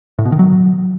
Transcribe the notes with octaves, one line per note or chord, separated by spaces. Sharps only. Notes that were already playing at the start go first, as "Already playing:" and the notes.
A2
B2
D#3
F#3